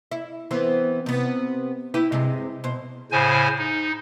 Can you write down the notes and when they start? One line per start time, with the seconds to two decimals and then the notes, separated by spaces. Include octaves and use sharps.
0.11 E4
0.51 E3 B3 C4
1.06 C3 B3
1.94 E4 G4 B4
2.12 G2 C3 G#3
2.64 B2 C5
3.12 A2 C#3 C5 G#5
3.58 D#4